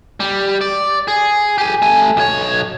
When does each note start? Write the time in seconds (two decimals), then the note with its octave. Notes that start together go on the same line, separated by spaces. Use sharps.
0.20 G3
0.61 D5
1.08 G#4
1.58 G4 G#5
1.82 A3 G#5
2.17 B1 C#5